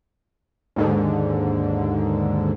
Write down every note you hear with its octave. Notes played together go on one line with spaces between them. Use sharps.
D#2 G#2 D3